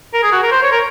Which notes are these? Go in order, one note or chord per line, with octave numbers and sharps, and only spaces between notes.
A#4
G#4
F#4
A#4
C5
C#5
A#4